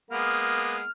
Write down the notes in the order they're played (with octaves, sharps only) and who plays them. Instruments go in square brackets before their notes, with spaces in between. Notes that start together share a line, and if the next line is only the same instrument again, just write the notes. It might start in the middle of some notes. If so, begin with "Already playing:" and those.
[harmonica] G#3 A#3 B3 [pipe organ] F6